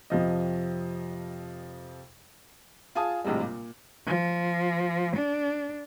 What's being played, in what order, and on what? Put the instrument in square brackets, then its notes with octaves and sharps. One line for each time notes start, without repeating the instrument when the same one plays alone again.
[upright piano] F2 C3 F3 D#5
[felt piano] F4 G#4 G#5 A5 D#6
A#1 A2 C3 G3 G#3
A#2
[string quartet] F3
D4